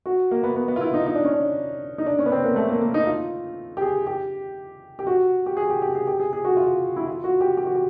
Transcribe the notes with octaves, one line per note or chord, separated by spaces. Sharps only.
F#4
A#3
B3
B3
B3
F4
E4
D#4
D#4
D4
C#4
D4
D#4
D4
C#4
B3
C4
A#3
A3
A#3
A#3
D#4
F4
G4
G#4
G4
G4
F#4
G4
G#4
G4
G4
G#4
G4
G#4
G#4
F#4
F4
E4
F4
F#4
G4
G4
F#4
G4